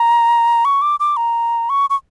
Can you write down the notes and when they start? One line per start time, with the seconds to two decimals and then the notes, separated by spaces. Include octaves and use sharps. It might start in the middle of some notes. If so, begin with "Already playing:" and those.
Already playing: A#5
0.65 C#6
0.82 D6
1.00 D6
1.17 A#5
1.70 C#6
1.90 C#6